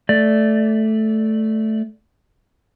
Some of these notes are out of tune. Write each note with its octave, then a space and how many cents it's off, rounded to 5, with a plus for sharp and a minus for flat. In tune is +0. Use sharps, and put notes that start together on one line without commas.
A3 -5 D5 +0